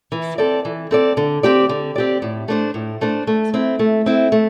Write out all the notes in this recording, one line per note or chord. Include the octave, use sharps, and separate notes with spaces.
E3
C4 A4 D5
E3
C4 A4 D5
D3
C4 G4 D5
D3
C4 G4 D5
A2
A3 D4 C5
A2
A3 D4 C5
A3
C4 E4
A3
C4 E4
A3